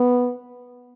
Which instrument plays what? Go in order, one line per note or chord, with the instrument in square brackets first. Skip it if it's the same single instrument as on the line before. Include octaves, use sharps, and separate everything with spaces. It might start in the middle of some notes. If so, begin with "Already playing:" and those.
Already playing: [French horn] B3